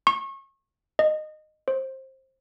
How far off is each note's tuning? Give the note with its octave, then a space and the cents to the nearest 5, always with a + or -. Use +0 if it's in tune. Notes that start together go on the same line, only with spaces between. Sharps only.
C#6 -30
D#5 -15
C5 +20